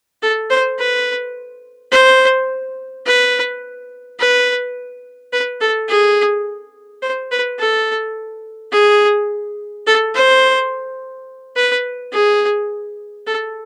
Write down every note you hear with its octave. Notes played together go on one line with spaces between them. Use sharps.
A4
C5
B4
C5
B4
B4
B4
A4
G#4
C5
B4
A4
G#4
A4
C5
B4
G#4
A4